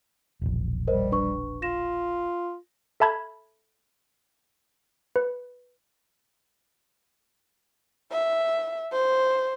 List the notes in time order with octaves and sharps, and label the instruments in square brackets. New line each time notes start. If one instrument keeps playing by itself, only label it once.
[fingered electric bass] E1 A#1
[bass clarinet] G3 [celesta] A#4 C5 D#5
[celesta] D4 B4 C#6
[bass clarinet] F4 [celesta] A#6 E7
[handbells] A4 E5 A5 B5 G#6
B4
[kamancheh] E5
C5